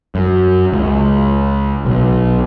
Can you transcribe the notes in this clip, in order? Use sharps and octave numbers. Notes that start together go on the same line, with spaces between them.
F#2
C#2
B1